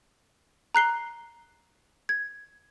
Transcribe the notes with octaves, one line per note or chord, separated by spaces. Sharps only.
A#5 F#6 C7 G7
G#6